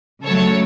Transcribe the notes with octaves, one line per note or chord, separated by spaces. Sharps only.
C#3 F#3 A3 A4 C#5